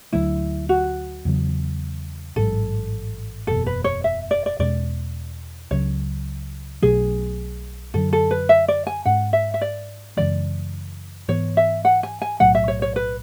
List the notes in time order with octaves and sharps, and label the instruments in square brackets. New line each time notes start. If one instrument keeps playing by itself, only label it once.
[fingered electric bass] D2 D3 F#3 A3 [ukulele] E4
[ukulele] F#4
[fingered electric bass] E2 C#3 F#3
[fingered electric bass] A1 G#2 F#3 [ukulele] A4
[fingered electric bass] F#1 E2 B2 [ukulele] A4
[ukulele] B4
C#5
E5
D5
D5
[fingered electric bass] E2 B2 G#3 C#4 [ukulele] D5
[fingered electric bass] C#2 C#3 F#3 C#4 [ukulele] C#5
[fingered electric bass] B1 B2 F#3 A3 [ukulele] G#4
[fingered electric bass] F#2 D3 F#3 [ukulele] A4
[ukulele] A4
B4
E5
D5
G#5
[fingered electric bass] G#2 G#3 C#4 [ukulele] F#5
[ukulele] E5
E5
D5
[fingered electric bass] F#2 C#3 E3 G#3 [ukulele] D5
[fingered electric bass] G#2 E3 B3 [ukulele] C#5
[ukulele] E5
F#5
G#5
G#5
[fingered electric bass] B1 A2 F#3 A3 [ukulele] F#5
[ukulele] E5
C#5
C#5
B4